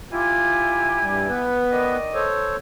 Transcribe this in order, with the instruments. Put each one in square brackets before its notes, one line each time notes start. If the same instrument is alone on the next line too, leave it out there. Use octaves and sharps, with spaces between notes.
[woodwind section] E4 G4 G#5 [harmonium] F4
[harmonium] G2 G3
B3 B4
[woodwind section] D#3 D5 D#5
[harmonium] A4 C5 C#5